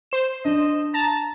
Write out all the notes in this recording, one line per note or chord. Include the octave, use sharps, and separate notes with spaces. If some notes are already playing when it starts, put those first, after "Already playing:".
C5 E7
D4 D#5
A5 A#5